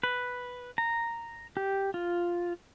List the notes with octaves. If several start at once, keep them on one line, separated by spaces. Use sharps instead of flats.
B4
A#5
G4
F4